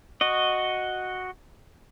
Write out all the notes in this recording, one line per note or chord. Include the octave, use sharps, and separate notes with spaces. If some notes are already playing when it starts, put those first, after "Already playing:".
F#4 D#5